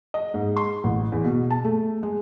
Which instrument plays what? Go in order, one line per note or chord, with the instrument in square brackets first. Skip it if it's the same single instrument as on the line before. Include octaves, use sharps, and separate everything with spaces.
[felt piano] D#5
G#2
C6
A1
E2
B2
A5
A3
G#3